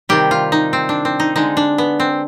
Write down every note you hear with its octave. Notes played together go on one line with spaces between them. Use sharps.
C3 D#3 G3 G4
F4
D#4
C4
D4
C4
D#4
D3 G#3 D#4
D4
B3
C4